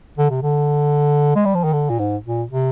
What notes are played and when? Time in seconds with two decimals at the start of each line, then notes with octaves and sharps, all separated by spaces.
0.17 D3
0.29 C3
0.42 D3
1.35 G#3
1.45 G3
1.54 F3
1.64 D#3
1.72 D3
1.89 A#2
1.99 G#2
2.25 A#2
2.51 C3